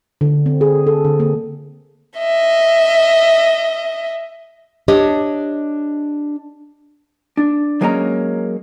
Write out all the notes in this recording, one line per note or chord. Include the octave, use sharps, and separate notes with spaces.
D3
C4
G#4
A4
D3
A#3
D#5 E5
D4 G4 C#5 D#5
D4
F#3 G#3 A#3 C#4 G#5 A#5